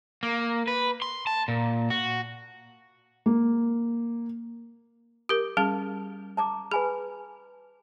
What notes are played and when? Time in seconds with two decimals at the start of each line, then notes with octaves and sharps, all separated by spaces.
0.23 A#3
0.68 B4
1.02 C6
1.27 A5
1.48 A#2
1.90 F#4
3.26 A#3
5.29 G4 A#4 D6
5.57 G3 C#4 G#4 A5
6.37 A5 A#5 D6
6.72 G#4 B4 G#5 B5